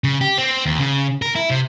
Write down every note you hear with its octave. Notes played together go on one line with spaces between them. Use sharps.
C#3
G4
C4
D#2
C#3
A#4
E4
C3